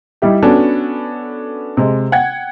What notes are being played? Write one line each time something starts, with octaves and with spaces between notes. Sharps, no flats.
G3 D#4 E4 G4
B3 C#4 D4 F#4 A4
C3 G#3
F#5 G5 G#6